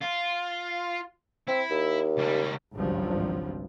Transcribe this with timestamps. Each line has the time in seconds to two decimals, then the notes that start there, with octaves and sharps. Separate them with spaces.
0.02 F4
1.48 C4 E4
1.71 D#2
2.18 C#2 G3
2.75 G#1 C#2 G2 F3 F#3